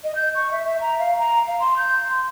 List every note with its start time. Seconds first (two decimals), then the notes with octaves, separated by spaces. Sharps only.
0.04 D#5
0.16 G6
0.35 C#6
0.52 E5
0.66 E5
0.81 A#5
0.99 F5
1.19 A#5
1.47 F5
1.60 C6
1.77 G6
2.09 C6